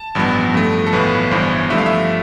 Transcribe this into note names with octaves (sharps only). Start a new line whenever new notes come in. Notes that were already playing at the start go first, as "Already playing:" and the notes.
Already playing: A5
A1 G2 F3 B3
G2 F3 A3
A4
B1 A2 E3 B3 B4
G1 G2 E3 B3 C5
G2 F3 A3 E5
F5
E5